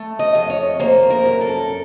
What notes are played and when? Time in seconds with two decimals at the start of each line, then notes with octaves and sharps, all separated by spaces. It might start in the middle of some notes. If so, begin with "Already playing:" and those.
Already playing: A3
0.19 D#5
0.35 F2
0.50 C#5
0.80 A#3 C5
1.10 A#4
1.25 F#2
1.41 A4